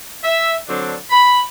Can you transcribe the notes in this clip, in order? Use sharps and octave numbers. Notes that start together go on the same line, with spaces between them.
E5
D3 F#3 C4 D4
B5